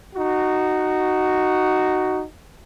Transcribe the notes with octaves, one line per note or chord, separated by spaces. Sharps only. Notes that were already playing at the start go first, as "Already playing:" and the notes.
D#4 F#4